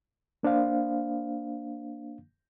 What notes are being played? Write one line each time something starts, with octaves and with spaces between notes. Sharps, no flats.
A#3 D4 C5 F5